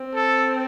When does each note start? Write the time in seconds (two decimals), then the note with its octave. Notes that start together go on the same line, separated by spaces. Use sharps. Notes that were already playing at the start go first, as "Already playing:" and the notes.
Already playing: C4
0.15 A4